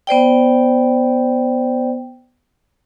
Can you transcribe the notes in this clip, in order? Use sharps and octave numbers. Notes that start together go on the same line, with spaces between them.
B3 C5 D5 G5